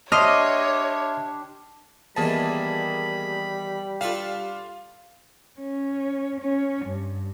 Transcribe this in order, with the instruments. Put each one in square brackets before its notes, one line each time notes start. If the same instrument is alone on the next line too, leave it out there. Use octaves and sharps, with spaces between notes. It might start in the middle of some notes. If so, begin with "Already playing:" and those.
[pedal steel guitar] D4 G4 [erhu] C#5 [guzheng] D#5 [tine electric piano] E5 C6 F6
[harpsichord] E2 D#3 [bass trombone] G3 [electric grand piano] A#3 G#4 A5 [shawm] B5
[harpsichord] D4 A4 B4 [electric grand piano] F4 F5
[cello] C#4
C#4
G2